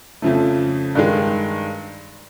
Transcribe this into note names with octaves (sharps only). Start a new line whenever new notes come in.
F2 C#3 F3 A3
G2 D#3 G#3